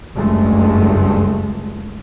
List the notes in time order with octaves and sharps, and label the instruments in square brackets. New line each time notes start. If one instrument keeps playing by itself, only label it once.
[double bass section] F#1 C#2 G2 G#3 A3